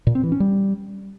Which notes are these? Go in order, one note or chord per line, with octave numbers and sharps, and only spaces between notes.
A#2
C4
E3
C#4
G3